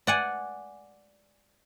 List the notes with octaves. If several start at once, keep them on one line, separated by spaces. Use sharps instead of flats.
D5 F#5 G#5